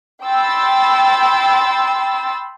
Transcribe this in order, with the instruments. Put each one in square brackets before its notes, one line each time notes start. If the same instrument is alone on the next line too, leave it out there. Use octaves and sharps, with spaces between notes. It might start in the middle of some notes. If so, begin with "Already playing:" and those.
[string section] G5 B5 C6 E6 A6